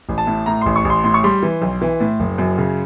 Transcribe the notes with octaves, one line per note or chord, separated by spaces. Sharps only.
A1
A5
A2
A2 A#5
A1 C6
C#6
A1
C6
A2 C6
C#6
G3 C6
E3
B1
E3
A2
F#1
F#2
C#3